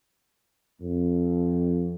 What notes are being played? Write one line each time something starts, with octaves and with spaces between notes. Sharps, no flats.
F2